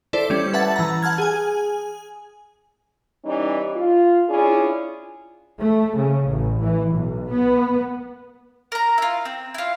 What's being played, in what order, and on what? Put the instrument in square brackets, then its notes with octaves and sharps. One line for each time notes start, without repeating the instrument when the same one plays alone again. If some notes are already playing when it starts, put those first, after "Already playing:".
[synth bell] E4 A4 C5 D5
G3 C#4
B4 E5 F#5 A5 A6
E3 A#5
F#5 A5 F6 G#6
G#4 G#5
[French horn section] E3 G3 C#4 D#4
F4
C#4 D4 E4 F4 G#4
[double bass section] A3
C#3
A1
E3
B1
B3
[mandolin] A#4 A#5
E4 F4
C4
E4 F4